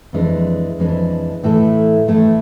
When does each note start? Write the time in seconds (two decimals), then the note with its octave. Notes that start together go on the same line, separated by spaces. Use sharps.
0.13 F2 E3 G#3 D4
0.79 F2 E3 G#3 D4
1.44 A2 E3 A3 E4 A4
2.08 A2 E3 A3 E4 A4